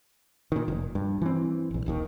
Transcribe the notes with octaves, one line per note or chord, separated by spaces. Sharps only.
A#2 D#3
F1
G2
E3 C4
D#1 A#1
D#1 D#2 D#3